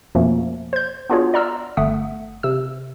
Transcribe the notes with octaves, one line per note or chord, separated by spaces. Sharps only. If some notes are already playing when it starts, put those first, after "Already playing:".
F2 B2 F3 A3 A#3 C#4
C5 G6
B3 D4 F4 F#4 G#4 C#5
D5 F#5 A#5 C6 E6 F6
G1 A3 F#5 D#6 B6
C3 E6